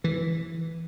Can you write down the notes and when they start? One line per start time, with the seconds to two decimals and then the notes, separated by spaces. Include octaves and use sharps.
0.04 E3